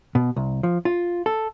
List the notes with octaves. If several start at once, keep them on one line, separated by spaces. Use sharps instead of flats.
B2
C2
F3
F4
A4